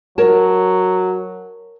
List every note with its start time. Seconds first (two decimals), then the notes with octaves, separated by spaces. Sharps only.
0.18 F#3 A#4 C#5 A5